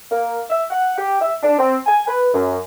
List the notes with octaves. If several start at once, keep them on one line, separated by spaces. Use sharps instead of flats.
A#3
E5
F#5
G4
E5
D4
C4
G#5
B4
F#2